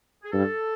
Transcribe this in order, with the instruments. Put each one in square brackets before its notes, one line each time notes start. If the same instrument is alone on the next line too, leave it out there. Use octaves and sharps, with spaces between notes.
[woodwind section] G#4
[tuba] G2 [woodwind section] A4